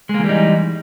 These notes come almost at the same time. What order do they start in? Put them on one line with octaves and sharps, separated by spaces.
G#3 A#3 E3 G3 D#4